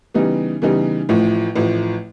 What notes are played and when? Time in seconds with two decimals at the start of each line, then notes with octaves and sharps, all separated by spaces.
0.14 C#3 E3 G3 B3 D#4
0.62 C#3 E3 G3 B3 D#4
1.09 A1 A2 F3
1.55 A1 A2 F3